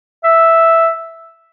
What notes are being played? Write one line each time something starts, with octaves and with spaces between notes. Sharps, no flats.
E5